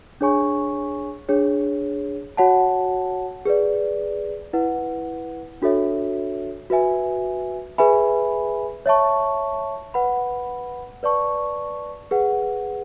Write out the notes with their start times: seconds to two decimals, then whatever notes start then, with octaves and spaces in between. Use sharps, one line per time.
0.21 D4 G#4 C#5 G#5 C#6
1.28 D4 G#4 C#5
2.37 F#4 C#5 F#5 A5
3.45 G#4 B4 D5
4.53 E4 B4 F#5
5.62 D4 F#4 A4 C#5 E5
6.70 F#4 B4 E5 G#5
7.78 G#4 B4 E5 G#5 B5
8.86 C#5 E5 A5 C#6
9.94 B4 F#5 B5
11.03 B4 D5 A5 C#6
12.11 G#4 B4 F#5